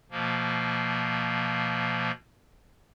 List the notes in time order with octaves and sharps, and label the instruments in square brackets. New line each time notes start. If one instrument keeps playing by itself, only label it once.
[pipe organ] B2 F3 A#3